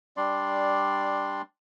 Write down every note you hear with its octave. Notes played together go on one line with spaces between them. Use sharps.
G3 D4 D5 C6